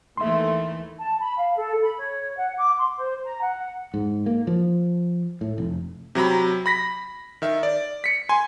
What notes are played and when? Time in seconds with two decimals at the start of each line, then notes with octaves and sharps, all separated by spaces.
0.17 D#2 E3 A3 E5 C6
1.00 A5
1.20 B5
1.38 F5
1.57 A4
1.82 B5
1.97 C#5
2.38 F#5
2.57 D6
2.77 C6
2.98 C5
3.24 A#5
3.41 F#5
3.94 G#2
4.26 A#3
4.47 F3
5.41 A2
5.58 F1
6.15 C3 F#3 A#5 B5
6.66 B5 A#6 B6
7.42 D#3 E5
7.63 D5
8.04 B6 C#7
8.29 G#5 C6